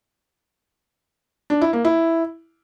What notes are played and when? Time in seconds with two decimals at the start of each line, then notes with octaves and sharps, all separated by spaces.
1.50 D4
1.61 E4
1.73 A#3
1.85 E4